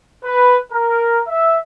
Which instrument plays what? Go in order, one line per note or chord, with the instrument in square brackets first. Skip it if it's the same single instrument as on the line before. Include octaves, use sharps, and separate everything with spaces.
[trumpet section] B4
A#4
E5